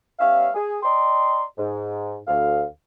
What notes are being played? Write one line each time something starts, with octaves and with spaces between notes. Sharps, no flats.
G3 B3 C#4 C#5 E5 F5
G#4
D5 D#5 G5 A#5 C6
G#2
D2 F5